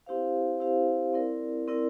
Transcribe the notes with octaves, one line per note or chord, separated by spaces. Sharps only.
C4 E4 G4 C5 F5
C4 E4 G4 C5 F5
C4 E4 A#4 D5
C4 E4 A#4 D5